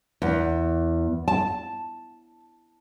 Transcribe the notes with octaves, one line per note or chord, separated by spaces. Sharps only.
E2
A5